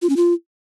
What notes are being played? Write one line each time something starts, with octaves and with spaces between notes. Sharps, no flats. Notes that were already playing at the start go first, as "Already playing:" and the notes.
F4
C#4
F4